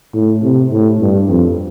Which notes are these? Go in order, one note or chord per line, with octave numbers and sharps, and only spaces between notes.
A2
C3
A2
G2
F2